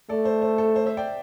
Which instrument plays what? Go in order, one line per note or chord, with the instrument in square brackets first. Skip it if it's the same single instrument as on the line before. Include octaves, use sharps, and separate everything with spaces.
[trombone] A3 [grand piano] A4 D5
[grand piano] C5
C5
A4
C5
C5 E5
D5 G5